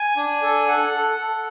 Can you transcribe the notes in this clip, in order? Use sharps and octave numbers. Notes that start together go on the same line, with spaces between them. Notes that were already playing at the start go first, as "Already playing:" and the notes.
Already playing: G#5
D4
A4
A4 F#5
A4
A4